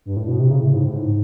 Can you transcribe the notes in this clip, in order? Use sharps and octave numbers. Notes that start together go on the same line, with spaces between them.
G2
A2
B2
C3
C#3
A2
G#2
A2
G#2